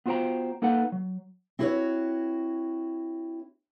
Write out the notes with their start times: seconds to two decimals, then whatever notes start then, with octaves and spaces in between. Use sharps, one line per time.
0.06 B3 F4 F#4 C5 G5 A#5
0.62 A#3 D#4 A4 B4 F#5
0.92 F#3
1.59 C4 E4 F#4 G#4 B4 C#5